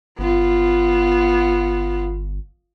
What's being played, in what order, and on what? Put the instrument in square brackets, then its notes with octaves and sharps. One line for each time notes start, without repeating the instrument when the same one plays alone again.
[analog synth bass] G1 [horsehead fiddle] B3 F4